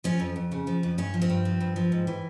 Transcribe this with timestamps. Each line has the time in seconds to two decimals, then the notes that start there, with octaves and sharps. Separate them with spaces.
0.04 F3 C#4
0.20 F2
0.36 F2
0.52 C#3
0.67 F3
0.83 F2
0.98 G2 C#4
1.14 F3
1.22 C4
1.30 G2
1.45 F3
1.60 G2
1.76 F3
1.92 G#2
2.07 E3